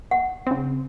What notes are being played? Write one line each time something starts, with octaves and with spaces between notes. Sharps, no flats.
F#5
C#3 C4